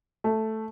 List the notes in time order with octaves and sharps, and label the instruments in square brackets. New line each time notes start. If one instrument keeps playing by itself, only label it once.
[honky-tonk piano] A3